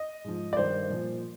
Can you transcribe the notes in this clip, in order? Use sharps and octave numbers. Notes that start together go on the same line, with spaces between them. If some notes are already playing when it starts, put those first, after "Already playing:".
Already playing: D#5
G#2 F3
D5
G2 D#3 C5
A#2 F3